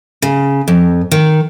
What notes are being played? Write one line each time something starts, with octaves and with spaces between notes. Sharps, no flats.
C#3
F2
D#3